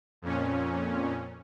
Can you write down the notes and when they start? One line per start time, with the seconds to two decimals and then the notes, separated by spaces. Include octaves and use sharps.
0.22 F2 A#2 C#4